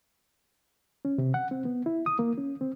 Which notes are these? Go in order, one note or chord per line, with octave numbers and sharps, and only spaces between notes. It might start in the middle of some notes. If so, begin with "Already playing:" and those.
C#4
C3
F#5
C4
B3
E4
D#6
A#3
C#4
C4